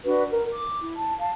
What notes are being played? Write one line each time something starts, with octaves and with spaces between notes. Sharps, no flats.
D4 F#4 B4
A#4
D6
E4
A5
F5 A5